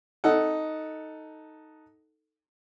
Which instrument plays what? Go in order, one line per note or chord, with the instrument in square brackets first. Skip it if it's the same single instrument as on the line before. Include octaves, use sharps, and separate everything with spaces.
[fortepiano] D#4 A4 F#5